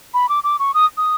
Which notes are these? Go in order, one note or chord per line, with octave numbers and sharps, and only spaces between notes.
B5
D6
D6
C#6
D#6
D#6